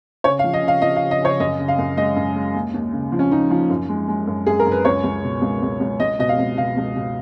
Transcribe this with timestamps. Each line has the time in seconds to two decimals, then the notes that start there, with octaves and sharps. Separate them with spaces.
0.24 C#3 C#5
0.39 F5
0.44 F3
0.53 D#5
0.63 C#3
0.68 F5
0.82 F3 D#5
0.96 F5
1.01 C#3
1.11 D#5
1.21 C#3 C#5
1.40 F#2 D#5
1.59 C#3
1.68 F5
1.78 F#2
1.97 G#3 D#5
2.16 F#2
2.36 G#3
2.55 D#2
2.74 D#2
2.93 C#3
3.12 F3
3.19 C#4
3.31 F3 D#4
3.50 F3
3.70 F#2
3.89 G#3
4.08 G#3
4.27 F#2
4.46 F#2 G#4
4.60 A#4
4.66 F#2
4.72 B4
4.85 C#2 C#5
5.04 C#2
5.24 B2
5.42 C#2
5.62 C#2
5.80 C#2
6.00 C#2 D#5
6.19 B2 D#5
6.29 F5
6.38 C#2
6.57 B2 F5
6.77 C#2
6.96 B2